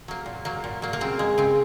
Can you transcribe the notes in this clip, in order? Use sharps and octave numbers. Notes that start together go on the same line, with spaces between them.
F#3 A#3
A#2
F#3 A#3
A#2
F#3 A#3
A#3
C#3 C4
G#3
C#3 C4